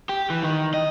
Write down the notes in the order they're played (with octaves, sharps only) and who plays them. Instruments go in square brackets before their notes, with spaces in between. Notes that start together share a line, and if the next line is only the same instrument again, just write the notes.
[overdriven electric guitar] G4
E3
D#3
D#5